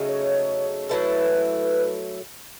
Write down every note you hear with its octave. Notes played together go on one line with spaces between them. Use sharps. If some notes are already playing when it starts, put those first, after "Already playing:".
Already playing: C#3 F#3 A3 D#4
C#5
F#3 A3 E4 A4 B4